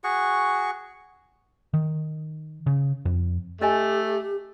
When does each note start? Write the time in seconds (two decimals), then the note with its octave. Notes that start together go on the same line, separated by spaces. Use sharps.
0.04 F#4 G#4 C#6
1.74 D#3
2.67 C#3
3.05 F2
3.61 A3 C#4 G4 D#5 G#5